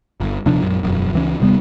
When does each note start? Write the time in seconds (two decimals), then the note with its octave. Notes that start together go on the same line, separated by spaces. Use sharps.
0.20 G1
0.45 D#1 C3 F3 D4
0.61 A#1 F#2
0.83 E1 F#2
1.13 C#2 E3 C#4
1.40 D#1 C3 G3 B3